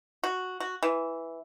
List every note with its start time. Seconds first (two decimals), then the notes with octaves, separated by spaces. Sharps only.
0.24 F#4
0.60 F#4
0.83 E3